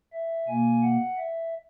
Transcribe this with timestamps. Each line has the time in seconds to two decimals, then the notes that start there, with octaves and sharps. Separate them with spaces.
0.13 E5
0.48 B2 A#3 G#5
0.83 F#5
1.18 E5